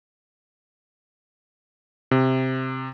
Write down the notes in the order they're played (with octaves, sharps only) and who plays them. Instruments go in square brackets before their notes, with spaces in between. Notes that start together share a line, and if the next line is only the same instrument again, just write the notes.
[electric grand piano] C3